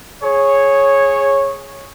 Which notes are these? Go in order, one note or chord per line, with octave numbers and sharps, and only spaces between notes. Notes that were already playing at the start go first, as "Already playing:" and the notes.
G#4 C#5